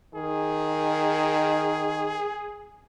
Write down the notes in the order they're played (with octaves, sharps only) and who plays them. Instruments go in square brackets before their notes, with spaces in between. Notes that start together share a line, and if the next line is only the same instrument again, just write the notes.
[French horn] D#3 [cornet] G#4